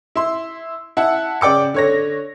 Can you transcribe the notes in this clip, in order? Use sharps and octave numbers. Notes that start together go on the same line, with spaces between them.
E4 C6
E4 F#5 A5
C#3 D5 G5 D6 C#7
D3 C#5 A#6